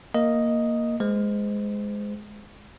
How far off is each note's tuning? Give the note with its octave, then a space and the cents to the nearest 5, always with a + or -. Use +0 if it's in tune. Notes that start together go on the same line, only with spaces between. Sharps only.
A#3 +0 A#4 +0 D#5 +0
G#3 +0 C5 -30